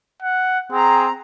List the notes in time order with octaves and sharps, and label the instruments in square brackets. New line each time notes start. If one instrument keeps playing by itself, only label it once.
[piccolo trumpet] F#5
[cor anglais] C4 [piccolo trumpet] G#4 [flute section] A#5